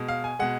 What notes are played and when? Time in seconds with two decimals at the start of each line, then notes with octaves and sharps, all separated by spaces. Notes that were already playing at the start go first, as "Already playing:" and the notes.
Already playing: B2 G#3
0.08 F5
0.24 G#5
0.39 B2 G#3 F#5